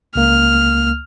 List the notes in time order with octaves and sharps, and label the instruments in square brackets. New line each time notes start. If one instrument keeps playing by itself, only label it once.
[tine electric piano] C#2 A#3 [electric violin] F6